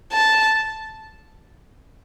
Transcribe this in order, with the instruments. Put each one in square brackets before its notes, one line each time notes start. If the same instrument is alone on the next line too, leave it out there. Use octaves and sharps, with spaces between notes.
[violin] A5